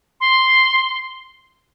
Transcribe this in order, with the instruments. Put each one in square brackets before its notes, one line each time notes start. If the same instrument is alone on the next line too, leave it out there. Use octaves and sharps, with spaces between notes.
[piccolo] C6